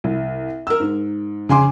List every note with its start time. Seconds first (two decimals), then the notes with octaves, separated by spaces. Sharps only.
0.04 C2
0.67 A#4 E6
0.80 G#2
1.49 C#3 G#5 C6 D6